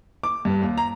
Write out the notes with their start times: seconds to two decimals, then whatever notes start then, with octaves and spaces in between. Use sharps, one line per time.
0.23 D6
0.45 G2
0.61 D#2
0.77 A#5